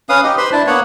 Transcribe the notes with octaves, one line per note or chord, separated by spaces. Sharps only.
C#4 B4 F5 D#6
D#4 G4 D#5
B4 C5 B5 C6
D4 E4 A5
A#3 B3 C#5 F#5